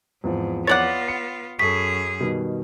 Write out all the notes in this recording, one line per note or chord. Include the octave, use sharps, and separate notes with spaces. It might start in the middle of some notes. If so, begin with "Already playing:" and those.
E2 G#2 F3 C4
B3 F4 C#5 D5 F#5 A6
C#7
F#2 G#4 A4 C#6 B6
B2 D#3 G3